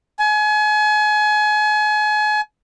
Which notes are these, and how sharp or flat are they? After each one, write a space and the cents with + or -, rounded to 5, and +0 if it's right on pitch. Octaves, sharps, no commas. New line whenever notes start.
G#5 +35